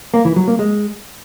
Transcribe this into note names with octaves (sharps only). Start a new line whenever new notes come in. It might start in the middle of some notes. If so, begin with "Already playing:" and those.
A#3
E3
F#3
A#3
G#3